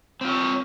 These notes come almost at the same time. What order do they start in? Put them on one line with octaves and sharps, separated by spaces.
C4 F4 C#5